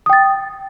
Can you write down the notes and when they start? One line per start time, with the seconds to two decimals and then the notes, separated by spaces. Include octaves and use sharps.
0.06 D#6
0.10 G5
0.13 A6